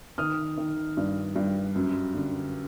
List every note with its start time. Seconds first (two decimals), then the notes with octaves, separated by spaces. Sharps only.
0.18 D#3 D#6 F6
0.57 D#3
0.97 G2
1.36 G2
1.76 F#2
2.15 D3